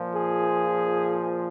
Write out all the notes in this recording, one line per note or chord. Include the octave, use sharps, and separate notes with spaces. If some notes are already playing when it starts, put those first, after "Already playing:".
Already playing: A#2 F3
G#4